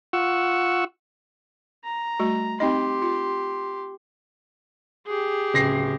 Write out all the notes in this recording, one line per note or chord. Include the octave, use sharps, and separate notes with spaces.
F4 F#5 C#6 E6
A#5
G3 A3 F#4
C4 D#4 G4 D#5 C6
F4
G4 G#4
D1 C#3 A#6 C7